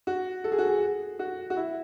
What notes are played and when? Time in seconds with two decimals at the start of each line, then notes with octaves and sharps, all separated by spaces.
0.07 F#4
0.44 A4
0.52 G#4
0.58 F#4
0.67 G#4
1.19 F#4
1.50 F#4
1.57 E4